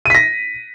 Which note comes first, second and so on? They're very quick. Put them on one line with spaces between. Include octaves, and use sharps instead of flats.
D#7 B6 A#6